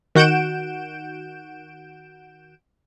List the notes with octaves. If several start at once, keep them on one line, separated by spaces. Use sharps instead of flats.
D#3 F#4 F#5 G6 D7 E7